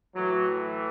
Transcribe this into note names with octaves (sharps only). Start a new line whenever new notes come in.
A2 E3 F#3